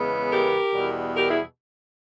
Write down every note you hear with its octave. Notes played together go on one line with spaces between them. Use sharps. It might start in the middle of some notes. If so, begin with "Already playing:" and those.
Already playing: E2 C#3 G#3 B3
G4 A#4
E2 B2 G3
G4 A#4
E4 G#4